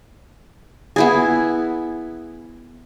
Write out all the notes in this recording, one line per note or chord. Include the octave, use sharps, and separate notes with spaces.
B3 E4 G#4